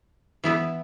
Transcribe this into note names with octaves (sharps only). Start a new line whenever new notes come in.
E3 B3 E4